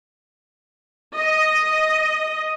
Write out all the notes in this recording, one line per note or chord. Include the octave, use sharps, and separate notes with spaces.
D#5